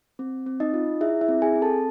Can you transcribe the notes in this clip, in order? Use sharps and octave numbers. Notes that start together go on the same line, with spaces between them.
C4
C4
D#4 D#5
F4
E4 G#4 E5
E4 E5
C4
G#4 G#5
C4
A4 A5